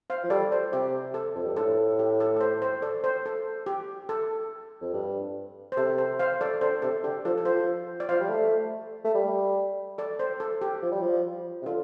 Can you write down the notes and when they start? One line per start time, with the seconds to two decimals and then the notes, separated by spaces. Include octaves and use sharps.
0.10 C5 F5
0.24 F3
0.30 G3 A4 D5
0.52 C5
0.72 C3 G4
1.14 A4
1.35 F2
1.46 G2
1.56 A2 A4
1.99 G4
2.20 A4
2.36 A4
2.41 C5
2.62 C5
2.82 A4 D5
3.04 C5
3.26 A4
3.66 G4
4.09 A4
4.81 F2
4.93 G2
5.72 C5
5.77 C3 A4
5.98 C5
6.19 C5 F5
6.41 A4 D5
6.61 D3 C5
6.82 C3 A4
7.04 D3 G4
7.25 F3 A4
7.38 A4
7.45 F3 C5
8.00 D5
8.09 F3 C5 F5
8.20 G3
8.29 A3
9.04 A3
9.15 G3
9.98 A4 D5
10.19 C5
10.40 A4
10.61 G4
10.82 F3
10.92 G3
11.02 F3
11.62 C3
11.66 D3 F4